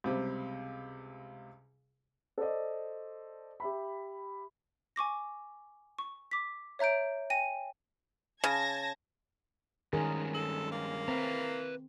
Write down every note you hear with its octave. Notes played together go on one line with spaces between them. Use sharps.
C#2 C3 G3
A4 C5 D5 D#5
G4 E5 B5
G#5 C#6 D6 A#6
C#6
D6 B6
C#5 E5 A#5 G6 D7
G5 G#5 A#6 D#7
C#3 A5 G#6 A#6
G2 D#3 G#3 C#4 G#4 A#4
A4
A#3
C4 B4 E5 A#5